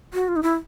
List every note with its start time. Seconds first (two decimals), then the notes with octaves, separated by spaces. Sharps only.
0.14 F#4
0.28 F4
0.36 D#4
0.43 E4